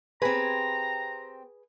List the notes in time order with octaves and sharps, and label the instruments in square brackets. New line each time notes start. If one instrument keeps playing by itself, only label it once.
[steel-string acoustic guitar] C4 G4 [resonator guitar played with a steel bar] G#4 B4 [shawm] A#5